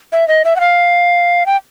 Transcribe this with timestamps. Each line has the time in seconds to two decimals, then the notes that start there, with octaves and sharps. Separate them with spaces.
0.12 E5
0.28 D#5
0.45 E5
0.56 F#5
0.60 F5
1.46 G5